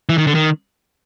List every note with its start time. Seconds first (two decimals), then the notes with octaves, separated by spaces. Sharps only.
0.09 E3
0.18 D#3
0.27 D3
0.35 D#3